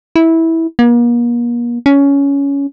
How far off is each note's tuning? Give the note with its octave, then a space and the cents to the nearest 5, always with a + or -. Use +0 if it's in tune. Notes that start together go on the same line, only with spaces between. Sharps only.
E4 -15
A#3 +40
C#4 +15